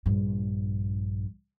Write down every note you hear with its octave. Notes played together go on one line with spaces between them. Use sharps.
A#1 G2